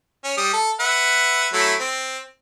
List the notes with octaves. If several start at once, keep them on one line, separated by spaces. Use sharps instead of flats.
C#4
G3 D#6
A4
B4 E5 F#5
F#3 A3 E4
C4